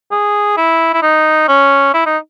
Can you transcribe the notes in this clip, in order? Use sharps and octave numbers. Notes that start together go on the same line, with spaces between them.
G#4
E4
E4
D#4
C#4
E4
D#4